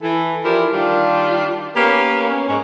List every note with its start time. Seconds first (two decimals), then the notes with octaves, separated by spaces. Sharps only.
0.02 E3 E4 A4
0.45 E3 F3 D4 E4 G4 A#4
0.73 D#3 G3 D4 F4
1.76 A#3 B3 C#4 G4 A#4 B4
2.30 C#4
2.48 G#2 C#4